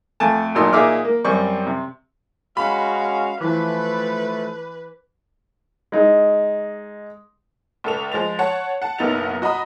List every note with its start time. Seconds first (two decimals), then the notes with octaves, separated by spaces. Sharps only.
0.20 F2 A3 G#5 A5
0.55 G#1 A#2 F#3 D#4 C6 E6
0.73 A#2 D#4 G#4 E5 D6 F6
1.05 A#3
1.25 F#2 G3 C4 C#6
1.66 C3
2.57 G#3 C#4 F#4 F5 B5
3.41 E3 F3 A3 B4
5.92 G#3 D#4
7.84 C#2 A4 F7
8.12 F3 G#3 A6 F7
8.39 C#5 F#5 A5
8.82 F#5 A5
8.99 F#1 B1 B3 D#4 A6 F7
9.42 F#4 D#5 A#5 B5 D#6